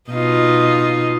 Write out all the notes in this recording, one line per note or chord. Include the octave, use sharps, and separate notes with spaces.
B2 D#4 F4